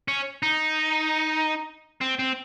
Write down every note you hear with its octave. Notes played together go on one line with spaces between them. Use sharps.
C#4
D#4
C4
C4